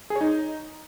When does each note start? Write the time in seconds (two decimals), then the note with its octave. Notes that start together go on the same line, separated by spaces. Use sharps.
0.10 G#4
0.16 C#5
0.21 D#4